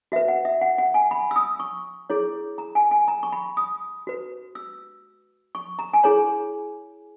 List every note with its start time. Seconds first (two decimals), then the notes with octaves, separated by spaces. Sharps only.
0.12 F#4 B4 E5
0.28 F#5
0.45 E5
0.61 F#5
0.78 F#5
0.94 G#5
1.11 B5
1.31 E6
1.36 D#6
1.60 C#6
2.10 E4 G#4 C#5
2.58 A#5
2.75 G#5
2.91 G#5
3.08 A#5
3.23 C#6
3.32 B5
3.57 D#6
4.07 F#4 B4
4.55 E6
5.55 C#6
5.79 A#5
5.94 G#5
6.03 E4 G#4 C#5 A#5